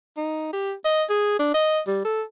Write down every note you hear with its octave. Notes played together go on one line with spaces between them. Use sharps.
D#4
G4
D#5
G#4
D4
D#5
G3
A4